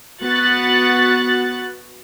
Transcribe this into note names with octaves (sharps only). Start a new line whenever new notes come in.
B3 F#4 F#6 A6